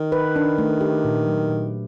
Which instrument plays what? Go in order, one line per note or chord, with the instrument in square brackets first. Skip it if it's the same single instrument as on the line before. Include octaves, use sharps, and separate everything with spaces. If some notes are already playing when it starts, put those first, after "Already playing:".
Already playing: [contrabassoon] D#3
[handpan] B4
D4
A3
G4
A#2
F#3
A#2